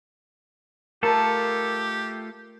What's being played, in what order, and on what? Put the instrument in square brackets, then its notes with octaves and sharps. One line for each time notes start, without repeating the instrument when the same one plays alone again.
[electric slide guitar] A3 F4 A4 [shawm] G4 [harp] A#4 A5